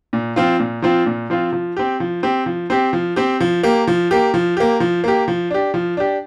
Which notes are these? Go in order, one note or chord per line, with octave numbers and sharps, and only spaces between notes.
A#2
F3 C4 F4
A#2
F3 C4 F4
A#2
F3 C4 F4
F3
C4 G4
F3
C4 G4
F3
C4 G4
F3
C4 G4
F3
A#3 G4
F3
A#3 G4
F3
A#3 G4
F3
A#3 G4
F3
D4 G4
F3
D4 G4